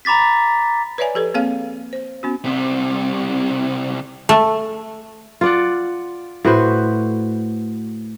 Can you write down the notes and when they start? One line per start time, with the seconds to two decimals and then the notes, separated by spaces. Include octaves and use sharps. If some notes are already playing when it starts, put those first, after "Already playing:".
0.05 A#5 B5 D6 A6 B6
0.98 B4 C#5 D5 E5 G#5
1.14 F3 G4 A4 B4
1.34 A#3 C4 G#4 C#5 F5
1.93 C5
2.23 B3 C#4 F#4
2.44 C2 C3
4.29 A3
5.41 F4 D5 F#5
6.45 A2 F#4 B4 C5